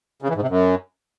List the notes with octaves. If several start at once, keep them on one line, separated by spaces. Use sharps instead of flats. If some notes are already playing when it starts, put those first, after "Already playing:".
C#3
E3
G#2
C3
F#2